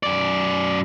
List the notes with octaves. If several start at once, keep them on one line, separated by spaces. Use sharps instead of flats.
F#2 D5